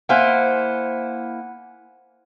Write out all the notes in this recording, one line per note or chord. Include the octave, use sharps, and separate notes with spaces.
A#3 E4 C5 F#5 G#5 F#6